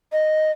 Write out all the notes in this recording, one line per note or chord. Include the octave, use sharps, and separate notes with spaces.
D#5